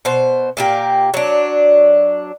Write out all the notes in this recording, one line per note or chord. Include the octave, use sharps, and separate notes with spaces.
B2 C5
A#2 A#3 G4
F#3 D4